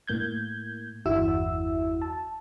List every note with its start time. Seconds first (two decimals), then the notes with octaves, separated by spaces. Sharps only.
0.07 A2 A#3 G6 G#6
1.06 G1 E2 E4 F#4 E5 E6
2.02 A5